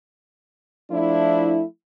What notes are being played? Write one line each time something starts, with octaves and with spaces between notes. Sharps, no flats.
F3 A3 D4 E4